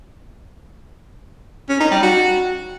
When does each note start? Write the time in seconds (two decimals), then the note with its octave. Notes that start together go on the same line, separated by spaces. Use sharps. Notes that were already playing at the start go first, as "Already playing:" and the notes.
1.69 C#4
1.80 D#4
1.91 G3
2.03 F#4